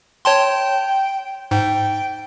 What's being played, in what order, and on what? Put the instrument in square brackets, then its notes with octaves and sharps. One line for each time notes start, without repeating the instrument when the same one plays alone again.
[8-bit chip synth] C#5 A5 C6 [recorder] G5
[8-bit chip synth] G#2 [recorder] G5